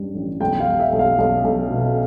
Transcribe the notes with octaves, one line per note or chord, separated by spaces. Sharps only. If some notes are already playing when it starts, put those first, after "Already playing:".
Already playing: A1 G2 G3
A1
B1 G5
F5
G3
E5
B1
F5
B1 F5
B1
B2